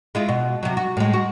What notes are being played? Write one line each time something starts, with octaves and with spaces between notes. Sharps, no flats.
G#3 E4 F4
B2
C3 F#3
F#4
A2 G#3
F#4